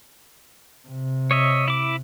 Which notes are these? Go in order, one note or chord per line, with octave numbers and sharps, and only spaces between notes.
C3
C#5 D#5 E5
E4 D6